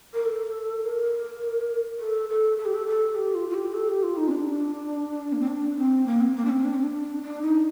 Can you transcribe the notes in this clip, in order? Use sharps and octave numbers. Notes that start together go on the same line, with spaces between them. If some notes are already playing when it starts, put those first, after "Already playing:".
A#4
A4
A#4
A4
A4
A4
G4
A4
A4
G4
F4
F4
G4
A4
G4
F4
D#4
C4
D4
A#3
C4
D4
C4
A#3
C4
A#3
D4
C4
D4
C4
D4
D4
D#4